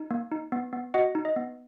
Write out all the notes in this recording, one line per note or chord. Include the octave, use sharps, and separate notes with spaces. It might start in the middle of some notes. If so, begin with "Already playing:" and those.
Already playing: D#4
A#3
D#4
B3
B3
F#4 D#5 F#5
D#4
D#5
B3